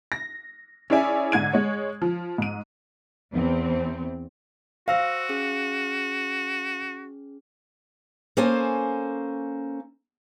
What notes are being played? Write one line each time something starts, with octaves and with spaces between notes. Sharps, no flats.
A#6
C#4 E4 G#4 D5 E5 G#5
G#2 D3 G#6 D#7
G#3 C#5
F3
G#2 D#7
E2 C4
F#4 C5 F5 E6 A#6
C#4 G#4
A#3 C#4 A4 C5 G#5